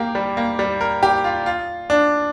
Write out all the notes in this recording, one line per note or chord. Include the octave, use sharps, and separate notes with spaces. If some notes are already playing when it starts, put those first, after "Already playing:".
Already playing: A#3 G4
G3
A#3
G3
A#4
G4
F4
F4
D4